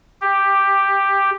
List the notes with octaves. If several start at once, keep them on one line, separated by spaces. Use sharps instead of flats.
G4